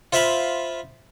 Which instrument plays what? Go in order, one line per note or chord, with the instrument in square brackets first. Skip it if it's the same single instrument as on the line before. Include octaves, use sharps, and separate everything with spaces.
[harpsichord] F4 C5 E5 F5 B5